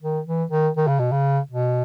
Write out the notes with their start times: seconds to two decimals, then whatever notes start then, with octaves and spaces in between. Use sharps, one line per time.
0.02 D#3
0.26 E3
0.51 D#3
0.77 D#3
0.88 C#3
0.99 B2
1.11 C#3
1.51 B2